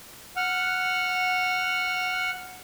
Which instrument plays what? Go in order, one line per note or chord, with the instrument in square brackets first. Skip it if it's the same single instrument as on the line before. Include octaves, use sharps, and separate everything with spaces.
[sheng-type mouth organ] F#5 F6